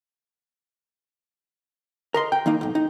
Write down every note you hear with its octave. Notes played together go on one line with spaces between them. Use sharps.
A#4 D#5 C6
G5
D#3 A#3 D#4
B1 G#2
D#4